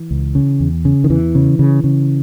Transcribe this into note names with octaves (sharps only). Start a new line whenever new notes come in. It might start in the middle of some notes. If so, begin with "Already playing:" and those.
Already playing: E3
C#2
C#3
E2
C#3
D#3
E2 E3
C#3
C#3
C#3